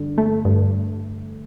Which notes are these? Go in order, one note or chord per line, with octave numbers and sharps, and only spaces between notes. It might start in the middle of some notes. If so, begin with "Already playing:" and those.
Already playing: G2 D3
A3
G2